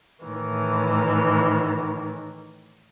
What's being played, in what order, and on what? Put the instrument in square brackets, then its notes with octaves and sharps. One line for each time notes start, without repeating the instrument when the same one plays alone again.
[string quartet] A2 D#3 E3